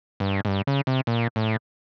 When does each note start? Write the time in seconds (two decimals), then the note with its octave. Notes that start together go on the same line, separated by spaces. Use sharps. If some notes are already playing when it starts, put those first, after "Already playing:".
0.20 G2
0.45 G#2
0.48 G2
0.67 C#3
0.87 C3
1.07 A#2
1.36 A2